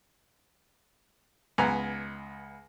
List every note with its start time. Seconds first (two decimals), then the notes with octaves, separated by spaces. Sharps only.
1.58 C#2 B3 G#5 A#5